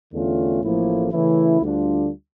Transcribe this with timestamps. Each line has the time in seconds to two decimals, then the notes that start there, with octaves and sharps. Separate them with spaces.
0.13 E2 D3 A3 C#4 F4
0.62 A1 A2 F3 A#3 E4
1.11 C#3 E3 A3 C#4 E4
1.61 D2 D3 G3 D4 F4